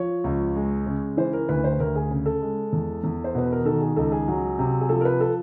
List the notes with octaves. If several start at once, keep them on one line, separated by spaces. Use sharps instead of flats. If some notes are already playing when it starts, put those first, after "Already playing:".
Already playing: F3 C#5
C#2
G#3
C#3
E3 C5
A#4
D2 B4
C5
B4
D2 A#4
G#4
C#3
A4
G#3
E2
E2
C5
B2 B4
A#4
D#3 A4
G#4
C#2 A4
G#4
F#3
C3
G#4
F3 A4
A#4
B4
A4